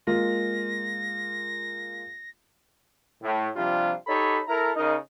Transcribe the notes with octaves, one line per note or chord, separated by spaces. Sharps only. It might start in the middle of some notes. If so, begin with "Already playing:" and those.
G#3 A#3 F4 A#6
A2
C3 F3 G3 D4 F4
D#4 G4 A4 C#5 B5
E4 A4 A#4 A#5
C#3 D#4 A#4 D#5